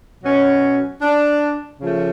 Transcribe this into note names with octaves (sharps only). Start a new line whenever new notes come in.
B2 F#3 C#4
D4
C#3 F3 A3